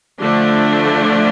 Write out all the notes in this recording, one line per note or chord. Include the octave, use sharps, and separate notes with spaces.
D3 F3 A3 D4